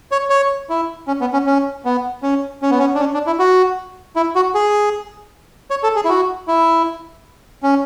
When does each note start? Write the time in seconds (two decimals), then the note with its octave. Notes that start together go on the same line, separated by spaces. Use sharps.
0.12 C#5
0.30 C#5
0.70 E4
1.07 C#4
1.21 B3
1.33 C#4
1.47 C#4
1.85 B3
2.23 C#4
2.62 C#4
2.71 B3
2.79 C#4
2.95 D4
3.00 C#4
3.14 D4
3.27 E4
3.39 F#4
4.16 E4
4.35 F#4
4.55 G#4
5.70 C#5
5.83 A4
5.96 G#4
6.05 E4
6.09 F#4
6.48 E4
7.63 C#4